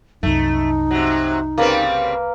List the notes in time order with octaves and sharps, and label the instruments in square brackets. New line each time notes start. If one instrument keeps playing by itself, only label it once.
[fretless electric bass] C2 F#2 [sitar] A3 [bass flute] D#4
[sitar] C3 F#3
[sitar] C#3 G3 C4 [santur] A#3 A#4 B4